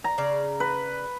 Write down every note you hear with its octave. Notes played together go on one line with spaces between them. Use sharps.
A#5
C#3 D5
B4